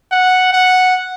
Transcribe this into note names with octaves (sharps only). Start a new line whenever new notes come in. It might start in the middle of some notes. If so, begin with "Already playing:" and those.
F#5
F#5